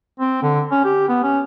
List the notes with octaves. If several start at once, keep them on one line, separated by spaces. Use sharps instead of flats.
C4
D3
C#4
G4
B3
C#4